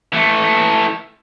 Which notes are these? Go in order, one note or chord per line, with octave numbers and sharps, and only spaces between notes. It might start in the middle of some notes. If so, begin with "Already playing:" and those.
E3 A3